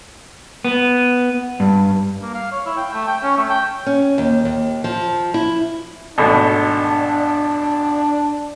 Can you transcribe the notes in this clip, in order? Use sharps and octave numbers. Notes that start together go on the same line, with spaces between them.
B3
G2
A#3
F5
C#5
E4
G5
A3
G5
C#4
A3
G5
C#4
D#2
D#2
F3
E4
G#1 B2 A3 D4